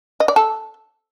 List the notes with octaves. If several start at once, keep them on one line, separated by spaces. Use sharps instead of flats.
D#5
D5
A4